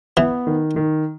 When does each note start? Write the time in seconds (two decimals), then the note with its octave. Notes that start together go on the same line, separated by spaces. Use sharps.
0.17 E3 B3
0.47 D#3
0.76 D#3